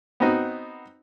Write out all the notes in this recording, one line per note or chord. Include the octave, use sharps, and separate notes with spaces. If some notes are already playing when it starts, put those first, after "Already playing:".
B3 C4 D#4 F#4